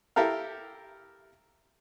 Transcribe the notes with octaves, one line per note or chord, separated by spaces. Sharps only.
E4 G4 A4 A#4 F5